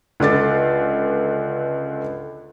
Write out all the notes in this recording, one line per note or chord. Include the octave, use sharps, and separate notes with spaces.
C#2 D3 D6 A6